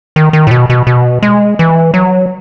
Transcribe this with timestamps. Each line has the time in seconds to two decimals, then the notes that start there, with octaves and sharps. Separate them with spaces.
0.16 D#3
0.33 D#3
0.47 A2
0.51 B2
0.70 B2
0.87 B2
1.22 G#3
1.59 E3
1.94 F#3